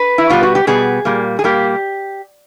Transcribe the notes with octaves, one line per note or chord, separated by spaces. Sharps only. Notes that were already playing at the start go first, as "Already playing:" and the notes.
Already playing: B4
E4
B2 G3 B3 F4
F#4
G4
B2 G3 B3 G#4
A#2 G3 A#3
G#4
A#2 G3 A#3 G4